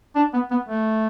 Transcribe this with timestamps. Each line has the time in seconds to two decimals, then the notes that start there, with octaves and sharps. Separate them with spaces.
0.15 D4
0.33 B3
0.51 B3
0.68 A3